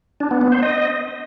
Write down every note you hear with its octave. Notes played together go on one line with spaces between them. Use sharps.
D4
B3
B3
C5
D#5